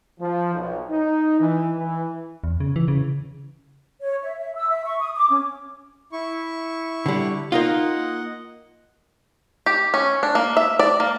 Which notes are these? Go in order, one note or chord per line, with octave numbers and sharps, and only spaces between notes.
F3
B1
D#4
E3
E3
E2
C#3
E3
C#3
C#5
E5
E5
E6
E5
C#6
D#6
D6
C#4
E4 C#6
D3 G3
A#3 D#4 F4 D#5 F#5
G4
C#4
D4
A#3
E5
D5
A#3